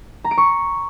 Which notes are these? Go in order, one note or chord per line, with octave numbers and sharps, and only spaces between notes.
A#5
D7
C#6